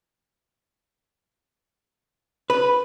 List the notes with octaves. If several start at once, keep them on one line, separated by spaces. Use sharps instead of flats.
B4